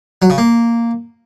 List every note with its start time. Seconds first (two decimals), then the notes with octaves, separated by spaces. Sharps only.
0.22 F#3
0.30 C#3
0.38 A#3